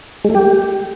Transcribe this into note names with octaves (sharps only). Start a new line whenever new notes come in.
G#3
A3
G4